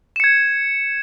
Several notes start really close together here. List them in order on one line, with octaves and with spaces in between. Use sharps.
E7 C#7 G#6